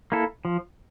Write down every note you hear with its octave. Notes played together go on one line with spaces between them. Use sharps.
A#3 E4 A4
F3